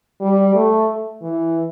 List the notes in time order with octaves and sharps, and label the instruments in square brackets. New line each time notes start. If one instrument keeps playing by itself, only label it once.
[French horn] G3
A3
E3